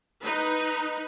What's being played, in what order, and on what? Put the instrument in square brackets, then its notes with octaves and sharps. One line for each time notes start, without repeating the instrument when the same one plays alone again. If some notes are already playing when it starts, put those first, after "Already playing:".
[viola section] D#4 B4